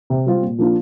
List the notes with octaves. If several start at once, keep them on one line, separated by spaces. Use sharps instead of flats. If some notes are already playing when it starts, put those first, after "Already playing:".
C3
G3 C4 F4
A#2
F3 A#3 D4 F4